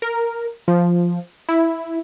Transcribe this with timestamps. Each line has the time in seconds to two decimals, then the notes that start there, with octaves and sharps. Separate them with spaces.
0.02 A#4
0.68 F3
1.49 E4